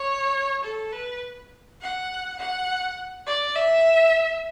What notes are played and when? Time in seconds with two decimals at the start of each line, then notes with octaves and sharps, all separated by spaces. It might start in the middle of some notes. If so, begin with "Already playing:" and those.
Already playing: C#5
0.64 A4
0.92 B4
1.81 F#5
2.39 F#5
3.27 D5
3.56 E5